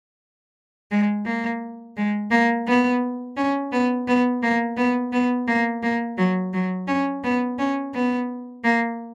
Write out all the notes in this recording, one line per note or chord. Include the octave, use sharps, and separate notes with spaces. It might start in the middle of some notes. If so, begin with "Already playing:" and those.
G#3
A#3
G#3
A#3
B3
C#4
B3
B3
A#3
B3
B3
A#3
A#3
F#3
F#3
C#4
B3
C#4
B3
A#3